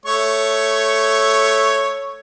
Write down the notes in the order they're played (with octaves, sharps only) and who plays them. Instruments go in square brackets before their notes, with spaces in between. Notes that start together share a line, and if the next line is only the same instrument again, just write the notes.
[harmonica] A3 C#5 C#6